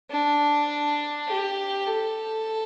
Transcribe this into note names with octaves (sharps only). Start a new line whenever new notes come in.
D4
G4
A4